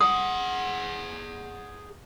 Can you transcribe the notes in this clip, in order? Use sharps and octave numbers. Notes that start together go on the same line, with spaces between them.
G#4 F#5 D#6